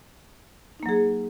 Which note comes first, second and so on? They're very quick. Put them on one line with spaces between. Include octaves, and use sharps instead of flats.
D#4 A#3 F#3 G#4